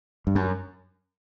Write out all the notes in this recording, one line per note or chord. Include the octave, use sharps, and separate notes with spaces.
G2
F#2